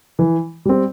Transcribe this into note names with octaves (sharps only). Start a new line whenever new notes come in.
E3
G3 C4